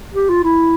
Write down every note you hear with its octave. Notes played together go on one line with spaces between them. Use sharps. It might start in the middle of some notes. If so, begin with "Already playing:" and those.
G4
F4
E4